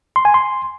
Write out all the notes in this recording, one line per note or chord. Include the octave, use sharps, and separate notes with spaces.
C6
G#5
C6